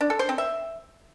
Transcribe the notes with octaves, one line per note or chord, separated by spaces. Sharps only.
D4
A4
C5
C4
E5